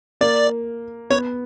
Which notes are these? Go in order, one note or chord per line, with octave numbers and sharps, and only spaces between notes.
A#3 D5
B3 C#5